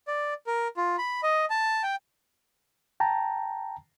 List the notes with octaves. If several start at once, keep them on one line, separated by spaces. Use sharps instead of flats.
D5
A#4
F4
B5
D#5
A5
G5
G5 A5 A#5